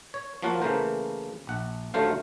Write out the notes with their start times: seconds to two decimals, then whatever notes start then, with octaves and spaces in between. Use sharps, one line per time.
0.14 C#5
0.42 F3 F#3 A#3 F4 F#4
0.62 C#3 E3 A3 A#3 A#4 C5
1.47 A#1 F#5
1.94 D#2 D3 F#3 A3 C5 F5